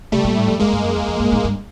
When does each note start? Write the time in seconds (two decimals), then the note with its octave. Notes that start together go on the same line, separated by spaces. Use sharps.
0.12 C3 G3 A3
0.24 A#2
0.36 A2
0.48 F2
0.59 F#2 G#3 A#3
0.72 G2
0.84 F#2
0.96 E2
1.08 F2
1.20 G2
1.32 G#2
1.44 G2